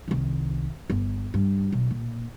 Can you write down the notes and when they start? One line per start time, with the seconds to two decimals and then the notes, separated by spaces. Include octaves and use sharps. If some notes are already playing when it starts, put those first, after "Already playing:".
0.08 C2 D#3
0.90 G1
1.34 G2
1.72 B1
1.91 A#2